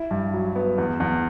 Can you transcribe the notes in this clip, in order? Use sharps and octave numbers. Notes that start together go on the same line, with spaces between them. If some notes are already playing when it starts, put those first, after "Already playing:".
Already playing: E4
G2
F#3
B3
E2
E2